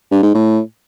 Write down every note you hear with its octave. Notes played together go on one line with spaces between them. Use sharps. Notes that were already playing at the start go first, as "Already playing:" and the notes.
G2
G#2
A2